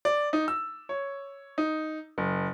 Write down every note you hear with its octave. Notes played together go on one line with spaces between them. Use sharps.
D5
D#4
E6
C#5
D#4
F#1